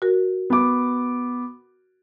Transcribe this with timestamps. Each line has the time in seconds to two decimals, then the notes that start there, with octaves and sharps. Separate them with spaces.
0.02 F#4 A#4
0.50 B3 D6